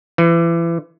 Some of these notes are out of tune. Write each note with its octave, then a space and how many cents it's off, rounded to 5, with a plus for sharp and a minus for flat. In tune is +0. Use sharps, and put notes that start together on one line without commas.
E3 +30